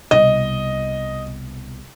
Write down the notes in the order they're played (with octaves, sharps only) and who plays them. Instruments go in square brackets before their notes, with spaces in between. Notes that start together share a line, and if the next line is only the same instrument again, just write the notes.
[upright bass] C2 B2 [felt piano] D#5